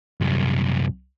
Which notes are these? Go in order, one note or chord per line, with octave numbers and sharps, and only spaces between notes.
C2 F#2